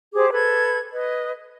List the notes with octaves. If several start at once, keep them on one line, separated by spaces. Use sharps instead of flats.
G4 G#4 C5 D6
A4 B4 B5 G#6
B4 D#5